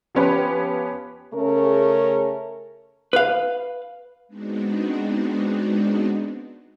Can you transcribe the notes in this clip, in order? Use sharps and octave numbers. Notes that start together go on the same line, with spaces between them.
F3 B3 C#4 G4 B4
C#3 A3 C#4 G#4 A#4
B4 F5
G#3 B3 C4 D4 D#4 F#4